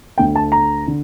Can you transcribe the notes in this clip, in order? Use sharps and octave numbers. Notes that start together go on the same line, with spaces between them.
D2 D3 A3 G5
A5
A#5
D3